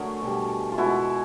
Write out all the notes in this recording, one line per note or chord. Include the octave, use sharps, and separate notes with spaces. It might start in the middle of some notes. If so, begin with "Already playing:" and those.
Already playing: D3 F#3 A3 G#4 A#4
B2 G3
F4
B2 G#3 E4 F#4